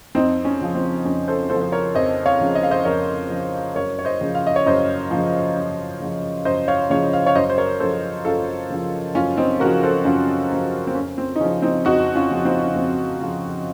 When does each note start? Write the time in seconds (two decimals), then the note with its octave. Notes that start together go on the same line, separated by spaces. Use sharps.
0.15 F2 C4 D#4
0.45 C#4
0.61 C#3 F3
0.75 C4
1.05 F2 C#4
1.28 A4 C5
1.50 C#3 A4 C5
1.55 F3
1.61 C5
1.72 A#4 C#5
1.95 F2 C5 D#5
2.26 C#5 F5
2.41 C#3 F3
2.55 D#5
2.63 F5
2.71 C5 D#5
2.85 F2 A#4 C#5
3.30 C#3 F3
3.75 F#2 A#4 C#5
3.99 C#5
4.05 C5 D#5
4.21 C#3 F3
4.35 F5
4.47 D#5
4.56 C#5
4.66 F#2 C5 D#5
5.11 C#3 F3
5.56 F#2
6.00 C#3 F3
6.45 F#2 C5 D#5
6.68 C#5 F5
6.90 C#3 F3 C#5 F5
7.13 F5
7.26 C#5 F5
7.35 F#2 C5 D#5
7.50 C5
7.58 A#4 C#5
7.80 C#3 F3 A4 C5
8.25 F#2 F4 A4
8.70 C#3 F3
9.15 F#2 C#4 F4
9.37 C4 D#4
9.60 C#3 F3 F#4 A#4
9.83 A4 C5
10.05 F#2 C#4 F4
10.51 C#3 F3
10.87 C4
10.95 F2 C#4
11.18 C4
11.36 D#4
11.40 C#3 C#4
11.44 F3
11.62 C4 D#4
11.85 F2 D#4 F#4
12.15 C#4 F4
12.30 C#3 F3
12.45 C4 D#4
12.63 C#4
12.75 F2 C4
13.20 C#3 F3